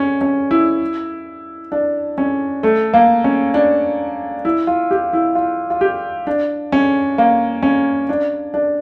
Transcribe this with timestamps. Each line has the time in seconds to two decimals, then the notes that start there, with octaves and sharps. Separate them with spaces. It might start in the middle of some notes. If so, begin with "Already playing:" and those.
Already playing: C#4
0.21 C#4
0.51 E4
1.72 D4
2.18 C#4
2.63 A3
2.94 A#3
3.24 C#4
3.54 D4
4.45 E4
4.67 F4
4.91 G4
5.13 E4
5.35 F4
5.70 F4
5.81 G4
6.27 D4
6.72 C#4
7.18 A#3
7.63 C#4
8.09 D4
8.54 D4